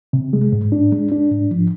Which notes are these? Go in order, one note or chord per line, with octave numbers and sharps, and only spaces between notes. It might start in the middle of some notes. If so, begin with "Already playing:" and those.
C3
G#3
G#2
D4
G#3
D4
G#2
F3